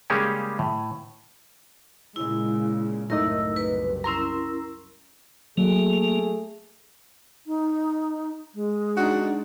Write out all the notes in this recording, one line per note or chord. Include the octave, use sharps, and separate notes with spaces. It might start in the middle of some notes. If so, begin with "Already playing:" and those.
C#3 G3 G#3 A#3 C#4 G4
A2
A#2 C#3 G#3 E4
F#1 C2 A2 D#4 A#4 D#5 E6
B4
C#4 E4 A#4 A#5 C6 E6
F#3 A3 A#3 G#4
D#4
G#3
D4 D#4 F#4